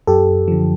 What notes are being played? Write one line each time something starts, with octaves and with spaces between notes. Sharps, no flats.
F#2 G4 A4
D3 F3